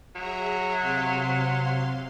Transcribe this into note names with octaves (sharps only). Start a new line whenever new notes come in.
F#3 G#4 E5 A#5
C3 F5 C6